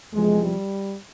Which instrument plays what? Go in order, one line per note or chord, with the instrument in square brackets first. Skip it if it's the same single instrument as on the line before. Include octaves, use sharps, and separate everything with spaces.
[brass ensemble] E2 C3 F3 G#3
G3